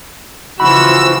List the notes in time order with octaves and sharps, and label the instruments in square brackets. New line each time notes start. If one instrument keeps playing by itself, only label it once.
[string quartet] C#3 E3 F3 [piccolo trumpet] F#4 [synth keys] B5 [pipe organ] E6